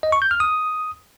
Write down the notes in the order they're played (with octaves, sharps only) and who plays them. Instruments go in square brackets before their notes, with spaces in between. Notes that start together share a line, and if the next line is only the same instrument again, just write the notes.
[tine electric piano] D#5
C#6
G6
F6
D#6